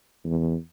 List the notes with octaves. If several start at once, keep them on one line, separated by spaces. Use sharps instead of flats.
E2